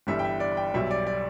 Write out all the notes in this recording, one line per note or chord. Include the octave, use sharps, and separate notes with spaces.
G1 G2 E3 G3 E5
G5
E5
D5
G5
B1 B2 G3 E5
D5
D5